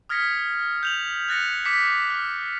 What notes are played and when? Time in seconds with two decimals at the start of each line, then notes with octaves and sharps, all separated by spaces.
0.09 D#6 F6 G#6 A#6 B6 C#7
0.83 G6 F7 F#7
1.28 F#6 A6 A#6 C#7
1.65 D6 B6 C#7
2.10 F6